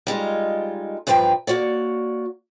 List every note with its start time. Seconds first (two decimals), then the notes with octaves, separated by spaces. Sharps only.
0.07 G3 G#3 D#4 F4
1.07 E2 G2 F3 B4 G5 A#5
1.47 A#3 F#4 C#5 D5